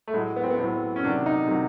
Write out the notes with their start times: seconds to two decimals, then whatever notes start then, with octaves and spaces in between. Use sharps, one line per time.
0.08 A3
0.14 A2 F#3 G#3
0.36 B3
0.43 C4
0.50 B3
0.58 A2 F#3 C4
0.96 C#4
1.03 C3 D#3 F#3 D4
1.26 D#4
1.48 C3 D#3 F#3